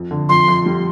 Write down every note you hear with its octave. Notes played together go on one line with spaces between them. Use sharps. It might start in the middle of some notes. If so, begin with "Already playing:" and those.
Already playing: F2
D3
F2 C6
F2
G3